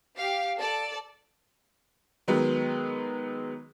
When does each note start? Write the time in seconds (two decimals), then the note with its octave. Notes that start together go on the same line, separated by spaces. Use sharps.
0.16 G4 F5
0.58 A4 D5
2.28 D#3 F#3 G#3 B3